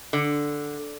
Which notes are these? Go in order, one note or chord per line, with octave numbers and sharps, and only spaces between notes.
D3